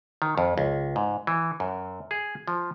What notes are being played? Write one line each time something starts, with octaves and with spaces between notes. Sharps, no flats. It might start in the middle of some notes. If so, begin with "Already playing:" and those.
D#3
F2
C#2
G#2
E3
F#2
G#4
F3